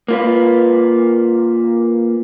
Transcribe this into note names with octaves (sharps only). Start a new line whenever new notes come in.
A#3 F4 B4